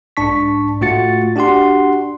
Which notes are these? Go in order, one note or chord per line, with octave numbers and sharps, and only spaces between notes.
B1 G#2 D4 A5 C#6 B6
A2 A3 F4 F#4 A6 C#7
D4 F#4 G4 F#5 C6